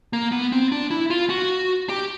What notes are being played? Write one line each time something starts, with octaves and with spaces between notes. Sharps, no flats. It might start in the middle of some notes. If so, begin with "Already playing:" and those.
A#3
B3
C4
D4
E4
F4
F#4
G4